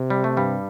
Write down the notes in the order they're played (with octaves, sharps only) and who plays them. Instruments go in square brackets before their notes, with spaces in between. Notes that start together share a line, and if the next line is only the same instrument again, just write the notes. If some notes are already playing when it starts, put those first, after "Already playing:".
Already playing: [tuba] C3
[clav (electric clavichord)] G3
A3
G2 G3